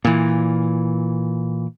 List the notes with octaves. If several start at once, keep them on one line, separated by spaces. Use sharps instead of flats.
A#2 E3